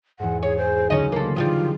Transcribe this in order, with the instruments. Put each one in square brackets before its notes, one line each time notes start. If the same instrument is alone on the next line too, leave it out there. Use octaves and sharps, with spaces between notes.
[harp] E2 G#2 [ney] F#5
[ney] G#4 [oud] C#5
[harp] G#4 [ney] C5
[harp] C#2 D3 F#3 [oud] C#4 D#5 [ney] D#4
[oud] A#3 A4 [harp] B4 C6
[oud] D#3 F3 G3 [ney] F4